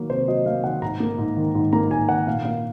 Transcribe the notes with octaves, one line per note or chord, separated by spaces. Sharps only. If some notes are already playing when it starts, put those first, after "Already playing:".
Already playing: D#3 F#3 A#3
C3 C5
F#3 D#5
A#3 F5
D#3 F#5
G#2 A#5
A#3
G#2
D#3
G#2
A#3 A#5
G#2 G#5
D#3 F#5
A#2 F5
A#3 F5